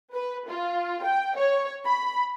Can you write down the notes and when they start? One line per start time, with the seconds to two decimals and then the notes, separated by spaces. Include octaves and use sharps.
0.13 B4
0.48 F4
1.03 G5
1.36 C#5
1.85 B5